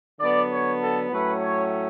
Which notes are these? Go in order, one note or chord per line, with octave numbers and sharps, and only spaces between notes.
D3 F#3 B3 D5
C#5
A4
A2 F#3 A3 C#4 B4
C#5